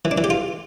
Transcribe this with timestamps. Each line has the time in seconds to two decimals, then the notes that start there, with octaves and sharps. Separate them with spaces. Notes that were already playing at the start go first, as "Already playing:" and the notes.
0.05 E3
0.11 D4
0.18 E3
0.24 G4
0.30 F4